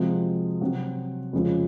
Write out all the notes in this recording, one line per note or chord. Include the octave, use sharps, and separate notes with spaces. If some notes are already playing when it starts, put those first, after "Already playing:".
Already playing: C3 F3 G#3 C4 F#4
C3 F#3 C4 F#4
F2 C#3 G#3 C#4 F4